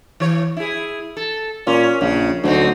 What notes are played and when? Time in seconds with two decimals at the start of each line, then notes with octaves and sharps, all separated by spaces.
0.20 E3 C#5
0.57 E4 G#4
1.17 A4
1.67 A#2 C#4
2.01 A#1 C#3
2.43 D2 F#3 C4 D#4